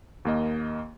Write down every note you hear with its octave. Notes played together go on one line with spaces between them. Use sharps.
D#2 A#3 D#5